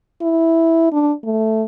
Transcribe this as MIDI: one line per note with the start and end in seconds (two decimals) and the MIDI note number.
0.22 0.88 64
0.92 1.13 62
1.24 1.65 57